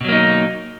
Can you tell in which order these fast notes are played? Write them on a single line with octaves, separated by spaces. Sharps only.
B2 F#3 A#3 D#4